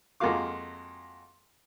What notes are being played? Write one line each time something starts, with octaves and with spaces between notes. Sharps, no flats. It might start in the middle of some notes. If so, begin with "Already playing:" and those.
F2 G#3 A#3 F#4 F5 D6